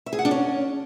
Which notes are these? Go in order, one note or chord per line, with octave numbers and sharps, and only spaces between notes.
E5
G#4
F#5
D4
C#4